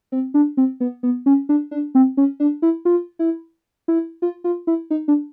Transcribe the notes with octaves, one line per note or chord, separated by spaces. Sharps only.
C4
D4
C4
B3
B3
C#4
D4
D4
C4
C#4
D4
E4
F4
E4
E4
F4
F4
E4
D#4
D4